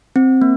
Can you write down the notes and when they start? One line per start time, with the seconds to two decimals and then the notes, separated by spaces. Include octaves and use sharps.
0.16 C4
0.42 A#3